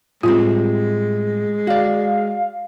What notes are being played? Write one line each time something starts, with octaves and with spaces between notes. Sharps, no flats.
A2 G3 G#3 C4 F4
F#4 D5 F5